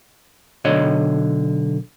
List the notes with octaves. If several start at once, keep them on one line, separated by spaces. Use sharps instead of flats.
B1 D3 C#5 D#5